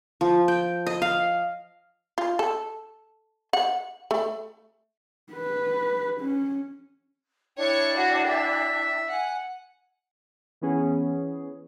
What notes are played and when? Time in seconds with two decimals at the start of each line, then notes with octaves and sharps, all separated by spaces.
0.21 F3
0.48 G5
0.87 D#5
1.02 F5
2.18 F4
2.39 A4
3.53 F#5
4.11 A3
5.33 B4
6.20 C#4
7.58 D4 E4 C#5 G5 C#6
7.96 F#4
8.28 E5
9.10 F#5 G#5
10.61 E3 B3 C#4 G#4